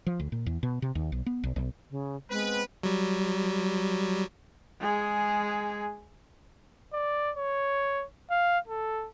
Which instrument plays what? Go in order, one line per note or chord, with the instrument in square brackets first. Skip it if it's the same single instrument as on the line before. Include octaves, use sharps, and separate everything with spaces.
[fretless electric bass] F3
D2
A#2
E2
B2
C3
D#2
B1
B3
B1
B1
[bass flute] C#3
[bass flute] G#3 [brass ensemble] B3 C4 B4
[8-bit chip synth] F#3 G3
[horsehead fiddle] G#3 G#4
[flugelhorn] D5
C#5
F5
A4